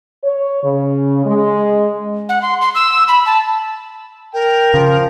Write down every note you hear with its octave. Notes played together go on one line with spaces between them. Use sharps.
C#5
C#3
G#3
F#5
C6
C6
E6
B5
A5
A#4 G5
C#3 F3